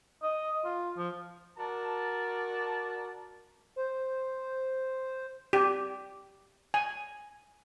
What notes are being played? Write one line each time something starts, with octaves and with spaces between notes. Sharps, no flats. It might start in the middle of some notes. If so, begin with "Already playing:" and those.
D#5
F4
F3
F#4 A#4 D5 A5
C5
G4
G#5